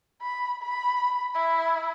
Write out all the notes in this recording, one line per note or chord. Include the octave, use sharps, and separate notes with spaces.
B5
B5
E4